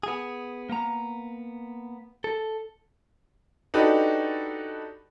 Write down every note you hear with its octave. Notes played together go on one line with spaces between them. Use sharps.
B3 G#4
A#3 B3 A#5
A4
D4 D#4 F#4 G4 A4 B4